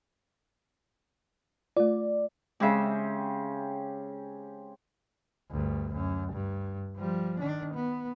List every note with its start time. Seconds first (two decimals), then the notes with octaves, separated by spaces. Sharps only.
1.77 A3 F4 D5
2.60 C#3 G#3 C4 G4 E5
5.51 D2 G2
5.94 F#2
6.33 G2
6.97 F3 G3
7.40 D#3 D4
7.75 B3